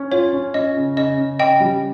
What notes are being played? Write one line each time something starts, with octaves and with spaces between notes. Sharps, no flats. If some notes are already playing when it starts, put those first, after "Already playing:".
Already playing: C#4
F4 C#5
C#4
C#4 D#5
C#3
C#3 D#5
C#3
C#3 D#5 G5
G3